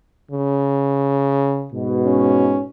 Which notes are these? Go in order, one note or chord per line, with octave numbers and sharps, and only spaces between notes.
C#3
G#2 B2
C#4